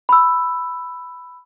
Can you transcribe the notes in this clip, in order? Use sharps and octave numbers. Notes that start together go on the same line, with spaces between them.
B5 E6